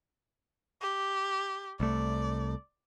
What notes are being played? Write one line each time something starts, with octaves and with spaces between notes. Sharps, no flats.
G4
C2 A3 D5